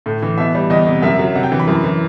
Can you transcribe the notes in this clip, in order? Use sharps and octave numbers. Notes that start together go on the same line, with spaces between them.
A2
E3
B2 E5
G3
E2 D#5
C3
F#2 E5
F#3
C3 F#5
G5
E3
B5
F#2
E3